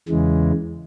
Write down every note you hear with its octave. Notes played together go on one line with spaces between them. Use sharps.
E2 C#3 E3 G#3